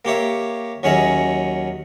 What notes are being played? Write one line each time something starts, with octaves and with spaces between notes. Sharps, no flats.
A#3 G4 C#5 E5
D#2 F#3 C#4 G#4 D#5 E5